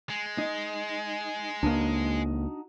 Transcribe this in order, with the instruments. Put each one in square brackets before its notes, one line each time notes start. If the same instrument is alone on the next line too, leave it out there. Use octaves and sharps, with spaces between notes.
[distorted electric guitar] G#3
[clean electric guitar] D#4
[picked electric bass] C#2 A#3 [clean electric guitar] D4 D#4 F#4